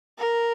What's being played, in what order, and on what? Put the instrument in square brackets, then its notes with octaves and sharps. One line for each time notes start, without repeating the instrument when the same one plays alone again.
[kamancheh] A#4